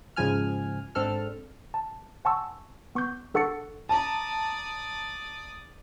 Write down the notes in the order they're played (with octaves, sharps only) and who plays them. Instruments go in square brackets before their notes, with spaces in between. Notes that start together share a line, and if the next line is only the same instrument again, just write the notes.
[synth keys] G#2 C#3 F3 G#5 F6
G#2 C4 D4 A4 F6
[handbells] A5
F#5 G#5 A5 C6 C#6 E6
B3 C#6 D6 G6
D4 A4 F#5 C#6 A6 C#7
[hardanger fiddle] D5 D#6 [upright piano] A5 A#5